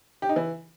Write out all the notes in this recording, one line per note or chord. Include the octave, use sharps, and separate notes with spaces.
G4
D#4
E3